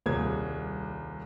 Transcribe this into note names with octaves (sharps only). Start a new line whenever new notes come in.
D#1 C2 G#4 G#6